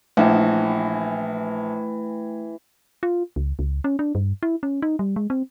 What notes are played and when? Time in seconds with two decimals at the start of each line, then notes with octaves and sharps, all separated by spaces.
0.17 A#1 E3 A3 G5
3.03 F4
3.36 C#2
3.59 C#2
3.84 C#4
3.99 D4
4.15 G2
4.43 E4
4.63 C#4
4.82 D#4
4.99 G3
5.16 G#3
5.30 C4